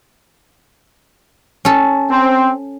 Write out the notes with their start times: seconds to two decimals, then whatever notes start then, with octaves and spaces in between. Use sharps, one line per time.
1.65 C#4 A4
2.11 C4